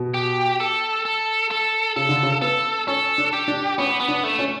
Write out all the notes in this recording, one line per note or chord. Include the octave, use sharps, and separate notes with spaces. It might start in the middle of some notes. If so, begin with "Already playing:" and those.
Already playing: B2
G4
A4
A4
A4
C#3 A4
D3
C#3
B3 A4
C#4 A4
D4
G4
D4
B3 C#4
B3
D4
A3
C#4